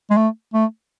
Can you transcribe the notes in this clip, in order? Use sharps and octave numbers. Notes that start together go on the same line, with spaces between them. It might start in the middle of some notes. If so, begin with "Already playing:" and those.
G#3
A3
A3